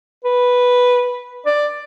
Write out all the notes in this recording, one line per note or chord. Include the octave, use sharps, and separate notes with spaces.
B4
D5